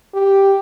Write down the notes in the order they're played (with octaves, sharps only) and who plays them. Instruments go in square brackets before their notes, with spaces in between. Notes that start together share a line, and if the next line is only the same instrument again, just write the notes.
[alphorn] G4